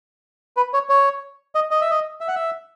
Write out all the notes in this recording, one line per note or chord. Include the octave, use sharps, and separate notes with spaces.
B4
C#5
C#5
D#5
D#5
E5
D#5
E5
F#5
E5